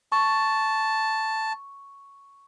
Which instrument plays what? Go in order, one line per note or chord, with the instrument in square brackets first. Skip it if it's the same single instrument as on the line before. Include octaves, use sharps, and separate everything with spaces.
[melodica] A5 [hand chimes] C#6